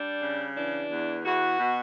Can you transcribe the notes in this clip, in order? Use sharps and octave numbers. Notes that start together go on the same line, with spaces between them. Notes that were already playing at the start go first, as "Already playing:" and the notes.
Already playing: G3 D4
C#3
E3 D4
E2
E2 F#4
B2